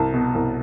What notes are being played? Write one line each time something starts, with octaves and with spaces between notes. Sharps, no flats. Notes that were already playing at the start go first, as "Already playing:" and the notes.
Already playing: C2 A5
B2
C2